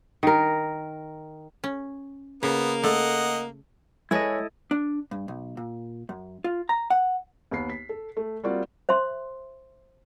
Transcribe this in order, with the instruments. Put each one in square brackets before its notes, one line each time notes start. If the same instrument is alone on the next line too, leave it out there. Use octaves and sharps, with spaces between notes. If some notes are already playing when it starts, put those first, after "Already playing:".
[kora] D#3 A#4
[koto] C#4
[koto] C#3 [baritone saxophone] A#3 [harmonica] B3
[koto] A3 [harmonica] D#5 F#5
[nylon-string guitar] G#3 B4 C#5 [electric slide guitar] E4 A4 D#5
[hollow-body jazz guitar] D4
G2
B1
A#2
F#2
F4
A#5
F#5
[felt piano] D#2 B3 B5 C7
B6
A4
A3
G3 A#3 C4 F4 F#4 D5
[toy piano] C5 E5 C6